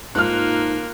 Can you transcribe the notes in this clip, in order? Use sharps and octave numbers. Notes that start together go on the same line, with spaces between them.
G#2 A#3 D#4 F4 A4 F6 F#6